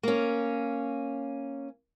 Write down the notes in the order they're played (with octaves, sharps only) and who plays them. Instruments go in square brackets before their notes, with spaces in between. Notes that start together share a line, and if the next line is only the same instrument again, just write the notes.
[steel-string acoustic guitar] A#3 C#4